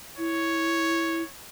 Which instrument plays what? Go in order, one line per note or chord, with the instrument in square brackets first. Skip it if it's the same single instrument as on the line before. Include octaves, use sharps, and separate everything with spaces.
[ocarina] E4 [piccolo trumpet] C#5